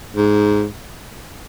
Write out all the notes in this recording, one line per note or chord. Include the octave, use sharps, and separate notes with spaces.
G#2